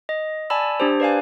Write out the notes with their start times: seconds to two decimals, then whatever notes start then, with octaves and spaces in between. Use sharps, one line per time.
0.09 D#5
0.50 D5 G#5 A5 B5 E6
0.80 D4 G4 C5
1.00 B4 D5 F5 G#5